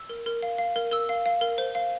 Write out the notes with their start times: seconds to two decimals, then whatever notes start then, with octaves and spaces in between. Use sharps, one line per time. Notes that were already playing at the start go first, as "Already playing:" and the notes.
Already playing: E6
0.09 A#4
0.26 A#4
0.43 F5
0.58 F5
0.76 A#4
0.92 A#4 E6
1.09 F5
1.26 F5
1.41 A#4
1.58 C5
1.75 F5